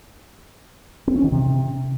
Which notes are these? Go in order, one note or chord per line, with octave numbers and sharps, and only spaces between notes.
C4
C#4
D#3
C3